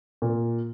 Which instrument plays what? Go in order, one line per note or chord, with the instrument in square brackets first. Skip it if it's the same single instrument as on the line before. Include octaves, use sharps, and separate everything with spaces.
[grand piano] A#2